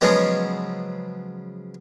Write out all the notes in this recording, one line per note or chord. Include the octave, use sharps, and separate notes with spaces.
C#3 F3 F#3 G#3 B3